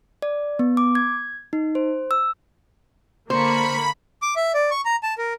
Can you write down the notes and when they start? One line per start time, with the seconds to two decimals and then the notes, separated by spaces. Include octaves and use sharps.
0.22 D5
0.59 B3
0.77 D6
0.95 G#6
1.53 D#4
1.75 C5
2.11 E6
3.30 D3 A#3 C5 A#5 B5 C#6
4.22 D6
4.36 E5
4.54 D5
4.71 C#6
4.85 A#5
5.03 A5
5.18 A#4